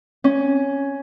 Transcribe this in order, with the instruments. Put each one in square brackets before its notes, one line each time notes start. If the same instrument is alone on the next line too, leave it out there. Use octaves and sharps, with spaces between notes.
[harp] C#4